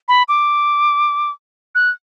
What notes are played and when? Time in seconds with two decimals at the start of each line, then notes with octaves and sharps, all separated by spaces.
0.08 B5
0.29 D6
1.75 F#6